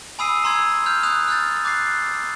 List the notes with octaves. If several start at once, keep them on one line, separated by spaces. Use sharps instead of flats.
G#5 B5 D#6 E6 C7 D#7
A#5 C6 E6 G#6
F6 G6 F7
D#6 F#6 G6 F7
F6 G6 A6
D6 F#6 A6 C7